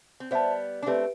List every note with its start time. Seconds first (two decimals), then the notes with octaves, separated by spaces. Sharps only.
0.20 C4
0.31 G3 B3 C5 E5 A5
0.83 D4
0.86 A3 C4 G4 B4 E5